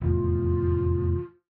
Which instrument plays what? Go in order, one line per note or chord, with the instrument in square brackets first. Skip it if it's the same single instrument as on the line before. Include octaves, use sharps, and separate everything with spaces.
[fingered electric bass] F1 E2 A2 [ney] F4